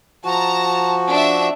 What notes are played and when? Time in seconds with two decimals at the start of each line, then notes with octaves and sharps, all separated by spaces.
0.25 F3 F#4 A5 A#5
1.09 D4 E5